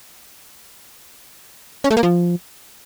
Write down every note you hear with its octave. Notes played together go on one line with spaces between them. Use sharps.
C#4
A3
A#3
F3